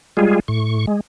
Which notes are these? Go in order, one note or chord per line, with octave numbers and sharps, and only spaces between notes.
G3 G#3 F4 G#4
A2 C#6
G#3